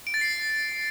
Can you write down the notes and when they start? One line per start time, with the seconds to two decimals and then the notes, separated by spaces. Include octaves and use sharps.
0.07 D7
0.14 A6
0.21 C7